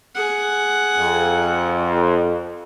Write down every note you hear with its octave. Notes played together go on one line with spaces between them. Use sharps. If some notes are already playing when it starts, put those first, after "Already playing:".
G#4 F#5
F2